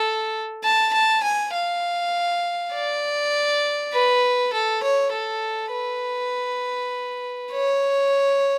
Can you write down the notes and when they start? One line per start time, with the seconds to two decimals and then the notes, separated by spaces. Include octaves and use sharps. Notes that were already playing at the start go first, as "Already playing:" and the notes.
Already playing: A4
0.63 A5
0.93 A5
1.23 G#5
1.54 F5
2.73 D5
3.93 B4
4.53 A4
4.83 C#5
5.12 A4
5.72 B4
7.51 C#5